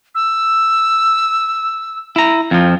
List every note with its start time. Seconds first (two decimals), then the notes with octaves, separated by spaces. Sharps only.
0.15 E6
2.16 E4 A#5
2.51 F2 F3